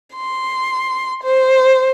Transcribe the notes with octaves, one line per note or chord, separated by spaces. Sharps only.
C6
C5